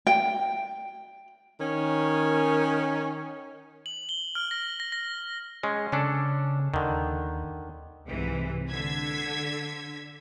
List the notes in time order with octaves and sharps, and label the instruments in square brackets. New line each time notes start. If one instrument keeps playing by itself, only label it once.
[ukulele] G5
[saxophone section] D#3 C#4
[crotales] F#7
G7
F6
A#6
A#6
A#6
[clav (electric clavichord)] G#3 C#4
[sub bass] C#3 [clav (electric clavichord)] C#4 D4 A4
[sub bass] D#2 [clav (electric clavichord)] D3 D#3
[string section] C2 G#2 C3 E3
D3 E6 G#6 B6